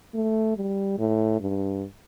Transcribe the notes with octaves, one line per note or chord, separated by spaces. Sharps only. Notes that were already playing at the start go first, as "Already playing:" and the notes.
A3
G3
A2
G2